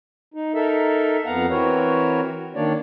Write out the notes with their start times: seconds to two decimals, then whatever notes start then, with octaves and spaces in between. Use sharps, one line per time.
0.34 D#4
0.55 D#4 A4 A#4 E5
1.25 F2 B3 F5 F#5 A#5
1.50 E3 C4 F#4 A#4 B4 C#5
2.55 D#3 A#3 D4 C#5 D5